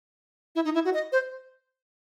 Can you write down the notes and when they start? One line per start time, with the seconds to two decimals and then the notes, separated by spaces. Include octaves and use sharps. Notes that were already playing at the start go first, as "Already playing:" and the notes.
0.56 E4
0.65 D#4
0.75 E4
0.85 F#4
0.94 D#5
1.12 C5